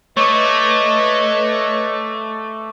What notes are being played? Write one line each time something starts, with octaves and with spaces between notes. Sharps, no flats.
A3 B4 C#5 D#5 C#6 D6